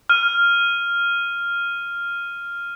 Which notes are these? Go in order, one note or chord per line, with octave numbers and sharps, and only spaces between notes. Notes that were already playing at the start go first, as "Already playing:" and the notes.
F6 D#7